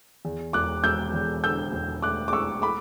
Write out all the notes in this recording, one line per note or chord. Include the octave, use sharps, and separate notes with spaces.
E2
E1 D6 F#6
E1 E6 G6
E2
D3 E6 G6
E1
A3 D6 F#6
D6
E1 C#6 E6
B5 D6